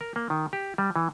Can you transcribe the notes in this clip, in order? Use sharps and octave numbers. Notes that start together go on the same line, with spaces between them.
A#4
A#3
D#3
G4
G3
E3